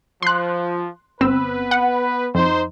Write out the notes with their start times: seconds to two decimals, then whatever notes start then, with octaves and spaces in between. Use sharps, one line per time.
0.22 F3 C6 F#6
1.21 G1 B3 C4 B4 E6
1.71 F#5
2.35 F2 D#4 C5